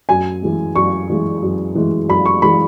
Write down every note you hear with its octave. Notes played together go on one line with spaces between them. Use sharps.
F#2 G#5
E3 G#3
F#2 C#6
E3 G#3
F#2
E3 G#3
F#2 B5
C#6
E3 G#3 B5